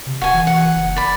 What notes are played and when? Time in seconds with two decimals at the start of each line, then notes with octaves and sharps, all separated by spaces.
0.06 C3
0.21 D#1 F#4 G#5
0.33 E3
0.47 F#5
0.75 F#1
0.96 D5 B5